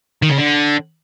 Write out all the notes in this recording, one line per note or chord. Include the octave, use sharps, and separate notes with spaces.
D#3
C#3
D3